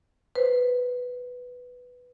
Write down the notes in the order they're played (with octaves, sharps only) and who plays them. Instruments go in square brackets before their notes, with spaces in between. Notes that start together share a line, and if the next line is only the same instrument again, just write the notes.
[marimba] B4 C5